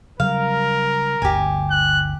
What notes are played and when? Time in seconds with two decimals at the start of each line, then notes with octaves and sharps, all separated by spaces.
0.20 C#3 F#3 G3 A#4 F5
1.22 G1 D2 G4 G#5
1.71 F#6